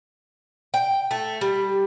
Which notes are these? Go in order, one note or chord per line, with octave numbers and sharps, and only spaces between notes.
G5
A3
G3